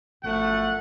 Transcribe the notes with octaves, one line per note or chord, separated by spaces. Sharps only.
G1 F#2 F3 A3 F#5